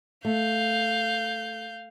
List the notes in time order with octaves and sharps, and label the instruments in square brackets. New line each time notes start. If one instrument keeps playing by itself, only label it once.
[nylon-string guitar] A3 [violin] F5 G6